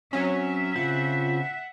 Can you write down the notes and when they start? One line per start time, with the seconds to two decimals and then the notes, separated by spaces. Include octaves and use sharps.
0.13 F#3 C4 C#4 E5
0.76 C#3 C4 F4 F#5